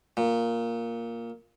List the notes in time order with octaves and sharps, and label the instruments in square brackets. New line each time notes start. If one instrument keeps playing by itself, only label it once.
[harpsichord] A#2